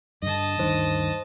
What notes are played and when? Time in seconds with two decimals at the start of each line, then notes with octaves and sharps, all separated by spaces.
0.22 G2 D3 D#5 A5
0.59 D2 G2 D#3 C5